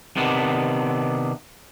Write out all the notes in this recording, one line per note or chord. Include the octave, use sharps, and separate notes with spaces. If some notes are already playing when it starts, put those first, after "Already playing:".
C3 D#3 B3 D4